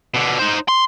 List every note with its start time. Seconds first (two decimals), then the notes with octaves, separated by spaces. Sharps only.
0.14 B2 D3
0.39 D#4 C5
0.68 C6